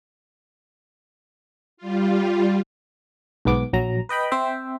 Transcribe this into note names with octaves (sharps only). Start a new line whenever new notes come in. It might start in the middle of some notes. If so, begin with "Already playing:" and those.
G3 F4
B1 G#2 B3 D6
A#1 F#3 A#5
B4 D#5 G5 B5
C4 C5 E5 G5